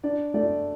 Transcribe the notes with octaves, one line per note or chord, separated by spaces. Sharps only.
D4 D5
A3 D5